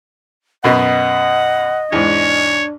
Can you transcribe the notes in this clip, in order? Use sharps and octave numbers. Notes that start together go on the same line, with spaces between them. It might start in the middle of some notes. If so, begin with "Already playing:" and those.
F#2 B2 B3 D#5 F#5
E2 G#2 D4 C#5